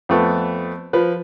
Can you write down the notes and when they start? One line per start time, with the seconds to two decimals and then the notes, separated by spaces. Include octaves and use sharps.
0.09 F2 A3 B3
0.93 F3 B4